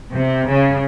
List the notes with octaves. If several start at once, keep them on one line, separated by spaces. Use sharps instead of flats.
C3
C#3